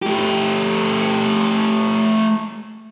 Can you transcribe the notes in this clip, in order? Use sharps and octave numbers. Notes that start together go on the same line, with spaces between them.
A3 G4